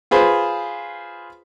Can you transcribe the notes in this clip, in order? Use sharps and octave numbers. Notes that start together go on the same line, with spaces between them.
F4 G#4 B4 C5